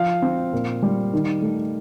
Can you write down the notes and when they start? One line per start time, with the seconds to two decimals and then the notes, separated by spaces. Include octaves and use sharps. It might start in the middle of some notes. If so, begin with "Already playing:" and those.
Already playing: F3 F5
0.22 C4
0.53 A#2
0.82 G3
1.13 D#3
1.42 A3